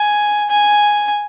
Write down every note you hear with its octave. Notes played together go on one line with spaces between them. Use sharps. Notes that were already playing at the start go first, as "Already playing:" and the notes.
Already playing: G#5
G#5